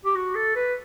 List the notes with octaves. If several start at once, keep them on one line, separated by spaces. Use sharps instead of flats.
G4
F#4
A4
B4